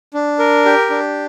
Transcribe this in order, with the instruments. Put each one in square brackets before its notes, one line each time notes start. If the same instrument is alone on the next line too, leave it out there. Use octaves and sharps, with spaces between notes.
[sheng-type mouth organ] D4
A#4
G4
D4